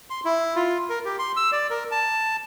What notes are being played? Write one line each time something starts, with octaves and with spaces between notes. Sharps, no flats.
C6
E4
F4
A#4
G4
C6
E6
D5
A#4
A5